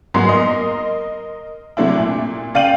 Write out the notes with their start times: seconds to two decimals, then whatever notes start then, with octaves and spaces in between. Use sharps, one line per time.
0.14 G#2 F#3 A#3 B3 C6 C7
0.29 A#4 D#5
1.77 C3 F#3 A3 D4 E4
1.99 A#2
2.54 C#3 D5 F5 G5 D#7 F#7